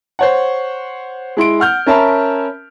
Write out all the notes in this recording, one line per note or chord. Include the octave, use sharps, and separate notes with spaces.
C5 C#5 F#5
G#3 E4 C6 D7
F#5 F6 G6
C#4 A#4 E5 A5 B5